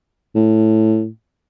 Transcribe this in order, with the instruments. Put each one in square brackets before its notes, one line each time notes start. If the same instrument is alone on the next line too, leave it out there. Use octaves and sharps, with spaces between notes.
[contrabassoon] A2